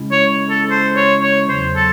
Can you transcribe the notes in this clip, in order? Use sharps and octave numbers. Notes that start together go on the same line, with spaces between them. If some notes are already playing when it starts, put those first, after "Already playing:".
Already playing: C#3 G#3 C#4 E4
C#5
A4
C5
C#5
C#5
E2 C#3 F#3 C5
A4